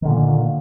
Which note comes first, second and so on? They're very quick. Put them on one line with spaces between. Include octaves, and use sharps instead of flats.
D#3 D3 A#2 A#3